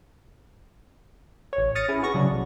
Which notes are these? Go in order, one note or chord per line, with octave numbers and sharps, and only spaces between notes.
A1 C#5
D#6 F6 A6 A#6 C#7 D#7
C#4 E4 G#4
B3 F#4 C#6 A#6
C#3 F#3 D4
B1